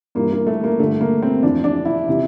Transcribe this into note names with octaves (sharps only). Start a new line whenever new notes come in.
G2 E3 A#3
A#3
A3
A#3
G2 D3 A3
A#3
C4
F2 E3 D4
D4
E4
C3 E3